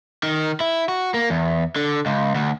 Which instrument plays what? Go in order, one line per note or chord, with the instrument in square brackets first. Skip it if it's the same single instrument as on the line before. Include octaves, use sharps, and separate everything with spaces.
[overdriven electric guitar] D#3
E4
F#4
A#3
E2
D3
C#2
D2